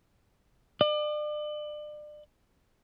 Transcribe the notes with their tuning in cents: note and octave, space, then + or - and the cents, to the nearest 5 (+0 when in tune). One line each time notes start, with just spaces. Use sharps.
D5 +35